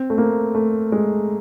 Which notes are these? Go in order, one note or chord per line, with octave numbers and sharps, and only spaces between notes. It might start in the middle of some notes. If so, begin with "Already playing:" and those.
Already playing: C4
A3
A#3
A3
G#3